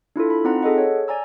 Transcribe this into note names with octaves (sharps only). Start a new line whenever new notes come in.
D4 E4 F4 A4
B5
C4 D#4 F4 F#5 A#5
G#4 A4 D#5 F#5
C#5
D5 G#5 A#5 E6